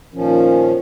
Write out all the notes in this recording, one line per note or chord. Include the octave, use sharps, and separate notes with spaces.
A#2 D#3 F3 C#4